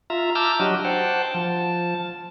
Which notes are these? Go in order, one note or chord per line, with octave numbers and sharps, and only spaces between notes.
F4 E5 A#5
A5 A#5 D6 E6 F6 G6
F#3 D4 F#4 G4 D#5
C5 F#5 G5 A5
F3 A5